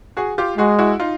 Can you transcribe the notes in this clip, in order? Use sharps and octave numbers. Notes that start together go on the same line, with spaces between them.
F#4 G#4
F4 G4
G#3 F#4 G#4
E4 F#4
D#4 F4